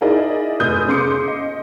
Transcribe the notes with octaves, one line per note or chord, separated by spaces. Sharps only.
D#4 E4 G#4 A#4 D5 D#5
F1 D#6 G6
C#3 C#4 C6 D6 C#7
D#5